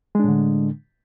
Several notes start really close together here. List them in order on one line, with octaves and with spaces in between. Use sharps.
G#3 D4 A2 D3